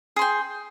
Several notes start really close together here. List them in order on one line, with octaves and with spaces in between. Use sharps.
G#4 C6 G5